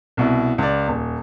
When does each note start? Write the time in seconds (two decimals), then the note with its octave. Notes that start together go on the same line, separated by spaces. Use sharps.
0.17 C2 B2 E4
0.58 C#2 D5
0.88 D#1